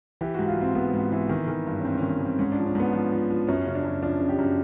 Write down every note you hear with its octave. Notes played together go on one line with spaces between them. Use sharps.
E3 G4
G#2 F#4
F4
G#2 C4
G#2 B3
G#2
E3
D#3
D#3
G2
C#4
G2 C4
D#3 C#4
D#3 C4
G#2 C#4
D4
F3
C#4
G#2 B3
F3
F3
F3
F#2 C#4
C#3
D4
F#2
F3 D4
C#3
G4
F#2